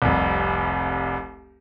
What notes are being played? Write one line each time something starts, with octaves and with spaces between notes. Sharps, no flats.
F1 C2